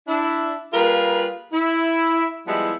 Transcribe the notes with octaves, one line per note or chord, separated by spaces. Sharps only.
D4 E4
G3 A#3 F4 G#4 A#4 B4
E4
F3 G3 G#3 B3 E4